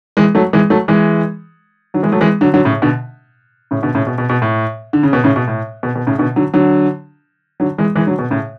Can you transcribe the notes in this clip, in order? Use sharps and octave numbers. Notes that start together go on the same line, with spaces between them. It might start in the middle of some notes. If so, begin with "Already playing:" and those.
E3 G#3
F#3 A3
E3 G#3
F#3 A3
E3 G#3
D3 F#3
E3 G#3
F#3 A3
E3 G#3
D3 F#3
D3 F#3
A2 C#3
B2 D3
A2 C#3
B2 D3
A2 C#3
B2
B2
B2
A2
D3
C#3
B2
A2 C#3
B2
A2
B2
B2
A2 C#3
B2 D3
D3 F#3
D3 F#3
D3 F#3
E3 G#3
E3 G#3
D3 F#3
B2
A2 C#3